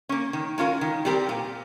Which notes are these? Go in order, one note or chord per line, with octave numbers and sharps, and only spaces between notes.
A#3 C#4
D#3
G#3 C#4 F4 A#4
D#3
G3 C4 G4 A#4
A#2